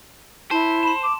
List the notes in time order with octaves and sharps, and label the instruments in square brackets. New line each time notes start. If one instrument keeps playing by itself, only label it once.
[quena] E4 [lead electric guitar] C5 [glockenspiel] A5
[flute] B5 [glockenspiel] C6 E7
[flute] D6